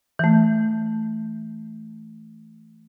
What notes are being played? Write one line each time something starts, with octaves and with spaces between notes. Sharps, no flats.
E3 A3